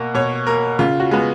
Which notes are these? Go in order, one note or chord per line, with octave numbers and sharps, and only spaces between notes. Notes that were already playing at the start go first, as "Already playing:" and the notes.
Already playing: B2 A#3
B2 C#5
A#3 A#4
C#3 F4
F#4
G#3 B3